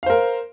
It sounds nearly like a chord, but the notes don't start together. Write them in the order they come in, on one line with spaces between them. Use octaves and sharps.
F5 C5 A#4